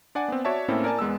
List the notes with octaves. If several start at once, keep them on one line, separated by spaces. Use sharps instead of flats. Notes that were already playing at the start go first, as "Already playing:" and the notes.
D4 D5 F#5 G#5
B3 C4
F#4 C#5 D5 E5 A5
A2 A#3 C4 C#4 E4 A4
A#4 D5 G#5 A5
E2 G#3 B3 E6